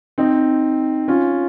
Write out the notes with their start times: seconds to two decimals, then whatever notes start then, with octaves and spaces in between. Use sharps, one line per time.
0.18 C4 D#4
1.08 C#4 F4